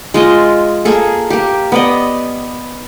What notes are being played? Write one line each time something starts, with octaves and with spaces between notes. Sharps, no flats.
G#3 F4 D#5
A#3 G#4 A4
A#3 G4
B3 D5 D#5